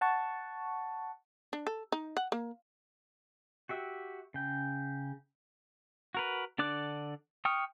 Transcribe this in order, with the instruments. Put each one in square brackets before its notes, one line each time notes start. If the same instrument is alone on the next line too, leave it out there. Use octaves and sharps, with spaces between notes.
[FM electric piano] F#5 A5 C#6
[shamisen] D4
A4
D#4
F#5
A#3
[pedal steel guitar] F#4 G4 E5
C#3 G5
F#4 A#4 B4
D3 D4 D5 D6 F#6
G5 C#6 D#6 F6